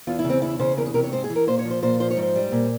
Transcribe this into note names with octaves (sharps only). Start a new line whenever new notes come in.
E2 F4
E4
C#3
C4
E2 E4
C#3 C5
E2 A#4
G#4
C3 A#4
C#5
G#2 C5
G#4
E3
A#4
A#2 C5
C#5
F3
C5
A#2 C5
F3 C5
C#5
G#2
C5
G3
A#2